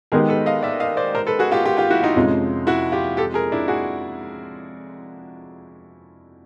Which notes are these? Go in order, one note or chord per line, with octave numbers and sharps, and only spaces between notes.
D#3 G#3 B3 D#4 G4 G#4 A#4
A4 B4
D#5 F5
D5 E5
D#5 F5
C5 D5
A#4 C5
A4 B4
F#4 G#4
F4 G4
F4 G4
F4 G4
E4 F#4
D#4 F4
F2 C3 F3 G#3 C#4
E4 F#4
F4 G4
G4 A4
G#4 A#4
D4 E4
F#4 G#4